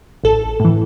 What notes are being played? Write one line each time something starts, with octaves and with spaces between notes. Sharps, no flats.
A1 A4
A2 E3